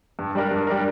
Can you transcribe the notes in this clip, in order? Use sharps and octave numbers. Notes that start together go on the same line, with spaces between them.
G2
G3 D4 A#4
G2
G3 D4 A#4